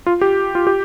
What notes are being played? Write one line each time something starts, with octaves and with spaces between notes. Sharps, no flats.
F4
G4
F4
G4